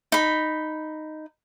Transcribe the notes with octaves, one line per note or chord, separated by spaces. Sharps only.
D#4 B5